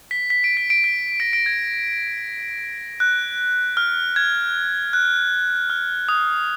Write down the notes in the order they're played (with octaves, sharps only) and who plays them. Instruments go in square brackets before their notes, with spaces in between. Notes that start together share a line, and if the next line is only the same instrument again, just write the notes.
[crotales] B6
B6
D7
B6
D7
B6
A#6 D7
A#6 D7
G#6
F#6
F6
G#6
F#6
F6
D#6